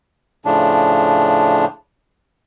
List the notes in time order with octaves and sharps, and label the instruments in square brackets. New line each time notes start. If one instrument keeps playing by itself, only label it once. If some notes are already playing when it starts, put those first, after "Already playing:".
[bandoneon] A2 C#3 F3 D4